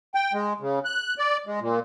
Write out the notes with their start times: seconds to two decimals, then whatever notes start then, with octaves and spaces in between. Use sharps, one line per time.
0.15 G5
0.33 G#3
0.60 C#3
0.85 F#6
1.18 D5
1.47 G#3
1.60 A#2